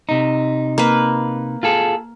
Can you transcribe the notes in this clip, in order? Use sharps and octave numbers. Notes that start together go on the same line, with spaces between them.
C3 D#4
A#3 B4
F4 G#4 A4